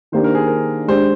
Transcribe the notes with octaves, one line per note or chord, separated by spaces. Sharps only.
D#3 A#3 D4 G4 C5
A#4
G#4
A#4
G#3 D4 G4 C5